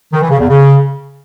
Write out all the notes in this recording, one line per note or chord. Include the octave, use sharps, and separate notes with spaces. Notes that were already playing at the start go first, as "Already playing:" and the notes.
D#3
E3
C#3
E2
C#3